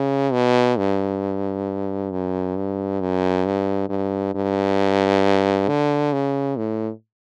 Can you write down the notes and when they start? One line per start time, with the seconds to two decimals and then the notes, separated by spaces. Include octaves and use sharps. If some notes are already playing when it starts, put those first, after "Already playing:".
Already playing: C#3
0.33 B2
0.78 G2
2.12 F#2
2.57 G2
3.01 F#2
3.46 G2
3.90 G2
4.35 G2
5.69 D3
6.13 C#3
6.58 A2